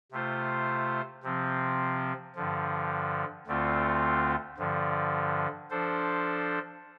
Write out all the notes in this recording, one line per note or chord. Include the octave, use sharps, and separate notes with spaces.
C3 A3 F4 C5
C3 F3 C4
G2 D3 F3
D2 D3 A3 C4 F4
G2 D3 F3
F3 D4 A4 C5